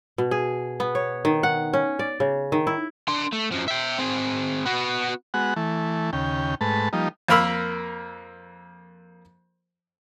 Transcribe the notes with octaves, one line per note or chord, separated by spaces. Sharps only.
B2
G#4
B3
C#5
D#3
F#5
C#4
D5
C#3
D#3
E4
D4 C6
A3
F#2 F3
E5 G5
C4 G#4
B3 F#4
G#3 B3 F#4 F#5
E3 A3
D#2 C#3 G5
G#2 A3 B4 A5
F3 G3 A#3 D#4
F2 A#3 A#4 B5 E6